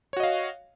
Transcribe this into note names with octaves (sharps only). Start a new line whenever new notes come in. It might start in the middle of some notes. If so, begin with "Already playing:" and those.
F#4 C#5 D#5 F5